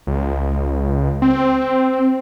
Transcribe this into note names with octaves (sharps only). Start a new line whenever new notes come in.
C#2
C4